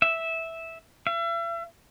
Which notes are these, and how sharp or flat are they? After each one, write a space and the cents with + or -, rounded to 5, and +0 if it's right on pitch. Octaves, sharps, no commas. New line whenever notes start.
E5 -10
E5 +40